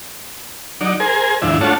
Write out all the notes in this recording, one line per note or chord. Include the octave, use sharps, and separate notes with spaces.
F#3 D#4 D5
G#4 A#4 C5 G#5
D#2 G#2 E3 F3 D4 E5
A3 D4 F4 F#4 C#5 A5